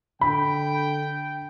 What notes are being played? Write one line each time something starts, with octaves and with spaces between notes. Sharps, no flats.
D3 G5 B5